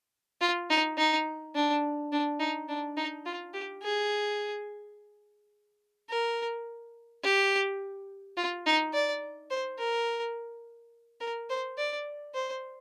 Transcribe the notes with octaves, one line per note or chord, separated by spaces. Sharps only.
F4
D#4
D#4
D4
D4
D#4
D4
D#4
F4
G4
G#4
A#4
G4
F4
D#4
D5
C5
A#4
A#4
C5
D5
C5